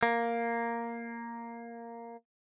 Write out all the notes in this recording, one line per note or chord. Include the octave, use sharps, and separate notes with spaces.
A#3